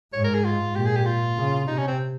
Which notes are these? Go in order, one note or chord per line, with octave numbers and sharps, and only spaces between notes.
G#2 C#5
A#4
G#4
F4
A#2 G4
G#4
G4
F4
C#3
C3 D#4
C#4
C4